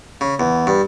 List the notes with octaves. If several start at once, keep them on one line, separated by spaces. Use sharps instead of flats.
C#3
E2
G2